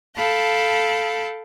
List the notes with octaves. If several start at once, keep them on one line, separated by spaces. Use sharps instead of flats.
A4 F5 G5 A5 B5